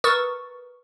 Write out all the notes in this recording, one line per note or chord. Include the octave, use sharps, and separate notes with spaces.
A#4 B4 C#6 D#6 E6 A6